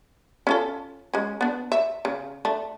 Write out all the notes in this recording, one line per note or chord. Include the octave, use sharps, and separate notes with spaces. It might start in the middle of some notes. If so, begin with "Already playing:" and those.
C#4 F4 A4
G#3 C#4
B3 D4
E5
C#3
A3 D4